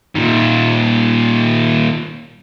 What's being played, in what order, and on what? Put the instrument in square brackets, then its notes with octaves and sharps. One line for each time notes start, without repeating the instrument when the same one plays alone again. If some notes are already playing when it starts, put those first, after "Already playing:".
[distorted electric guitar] A#2 D#3